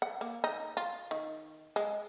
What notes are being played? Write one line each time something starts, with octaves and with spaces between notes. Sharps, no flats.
F#5
A#3
D#4
F4
D#3
G#3